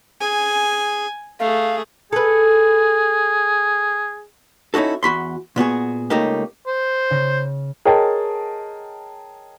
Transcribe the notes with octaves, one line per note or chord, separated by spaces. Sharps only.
G#4 G#5
A3 G#4 F5
G#4 A4 B4
C#4 D#4 E4 F#4 A4
E2 F#4 B5 C6
A#2 B3 F#4 G#4
C#2 C#3 A3 A#3 D#4 G4
C5
C#3 A#6
G#4 A#4 C#5 D#5 G5 A5